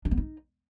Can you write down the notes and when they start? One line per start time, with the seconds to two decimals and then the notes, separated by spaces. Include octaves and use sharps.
0.05 D4
0.11 B3
0.17 D#4